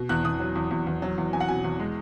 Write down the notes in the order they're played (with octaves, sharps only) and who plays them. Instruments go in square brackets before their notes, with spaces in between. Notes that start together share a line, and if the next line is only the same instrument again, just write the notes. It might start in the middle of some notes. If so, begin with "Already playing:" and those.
Already playing: [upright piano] B2
E2 F#6
E2 D#6
F#3
E2
E2
E2
F#3
E2
E2 G#5
F#5
B2 G#5
E2
G#3